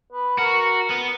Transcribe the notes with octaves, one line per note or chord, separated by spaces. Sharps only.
B4
F#4 A#4
B3